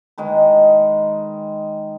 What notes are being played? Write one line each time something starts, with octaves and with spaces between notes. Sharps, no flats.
D#3 G#3 B4